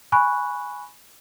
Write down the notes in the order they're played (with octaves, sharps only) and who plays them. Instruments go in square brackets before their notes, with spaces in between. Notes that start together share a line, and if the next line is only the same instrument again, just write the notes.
[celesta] G#5 B5 C#6 F#6